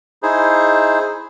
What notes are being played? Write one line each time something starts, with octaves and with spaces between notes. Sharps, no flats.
D#4 E4 G#4 C5